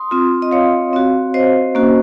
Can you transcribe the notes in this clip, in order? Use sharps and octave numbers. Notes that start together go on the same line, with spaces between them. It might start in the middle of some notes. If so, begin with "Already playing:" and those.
Already playing: C6 D#6
C4 F4
D#5
C#5 F5
C4 F#4
C5 D#5
A#3 C#4 F#4